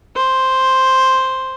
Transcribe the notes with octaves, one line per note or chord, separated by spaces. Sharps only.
C5